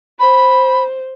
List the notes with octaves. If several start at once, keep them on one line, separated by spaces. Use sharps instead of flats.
C5 B5